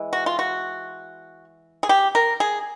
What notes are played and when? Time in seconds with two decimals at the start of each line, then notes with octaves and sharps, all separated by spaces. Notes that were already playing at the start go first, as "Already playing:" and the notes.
Already playing: E3 G#3
0.13 F#4
0.26 F4
0.39 F#4
1.83 G#4
1.89 G4
2.15 A#4
2.40 G#4